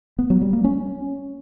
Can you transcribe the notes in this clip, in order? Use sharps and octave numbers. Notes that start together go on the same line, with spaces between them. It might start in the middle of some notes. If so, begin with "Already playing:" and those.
B3
F#3
G3
A#3
C#4